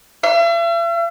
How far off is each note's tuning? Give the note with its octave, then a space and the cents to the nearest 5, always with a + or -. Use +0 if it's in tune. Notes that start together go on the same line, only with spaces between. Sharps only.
E5 +45